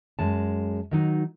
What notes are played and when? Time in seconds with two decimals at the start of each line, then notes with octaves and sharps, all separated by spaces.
0.19 F#2 G#3 A5
0.91 D#3 F#3 D#4